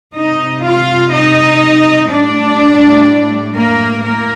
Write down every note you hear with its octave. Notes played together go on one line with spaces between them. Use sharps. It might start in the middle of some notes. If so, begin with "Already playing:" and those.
C3 G3 D#4 D#5
F4 F5
D#4 D#5
A2 G3 D4 D5
A#3 A#4
A2 A#3 A#4